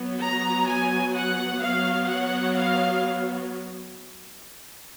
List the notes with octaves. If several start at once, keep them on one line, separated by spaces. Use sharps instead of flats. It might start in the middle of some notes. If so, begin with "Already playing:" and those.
Already playing: F#3 B3
A#5
G#5
F#5
F#3 B3 F5
F#5
F5